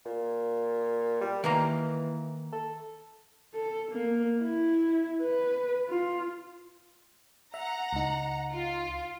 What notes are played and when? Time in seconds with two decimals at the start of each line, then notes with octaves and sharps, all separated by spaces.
0.06 A#2
1.21 G3
1.44 D#3 E3 A#3 A#5
2.53 A4
3.55 A4
3.92 A#3
4.41 E4
5.22 B4
5.89 F4
7.54 E5 F#5 A#5
7.93 C#2 D#4
8.53 F4